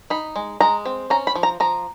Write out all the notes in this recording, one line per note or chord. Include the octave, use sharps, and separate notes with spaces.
D#4 B5
G#3
G#3 A#5
C4
C#4 A#5
B5
F3
A#5
F3 A#5